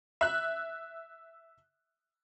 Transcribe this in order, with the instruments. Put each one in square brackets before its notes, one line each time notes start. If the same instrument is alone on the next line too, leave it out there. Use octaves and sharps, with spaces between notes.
[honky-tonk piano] E5 F#6